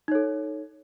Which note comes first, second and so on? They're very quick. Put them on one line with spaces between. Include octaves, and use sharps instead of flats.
D#4 C#5 A4